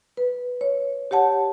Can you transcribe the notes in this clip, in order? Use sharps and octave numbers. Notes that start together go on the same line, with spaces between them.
B4
C#5
G4 C#5 F#5 A5